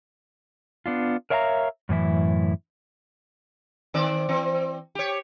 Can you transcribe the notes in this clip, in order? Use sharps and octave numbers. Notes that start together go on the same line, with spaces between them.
B3 D4 F4
A#4 C#5 E5 F5 G5 A#5
F#2 A2 E3 E4
D#3 C4 D5
E3 C4
G4 C#5